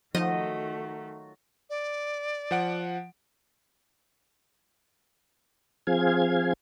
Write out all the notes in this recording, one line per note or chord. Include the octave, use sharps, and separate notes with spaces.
D#3 F3 F#3 A3 D#4 F4 F#4 D#5
D5
F3 F#5 D7
F3 C4 G#4 F5 G#6